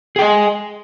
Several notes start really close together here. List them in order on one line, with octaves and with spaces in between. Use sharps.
G#4 G5 D#5 G#5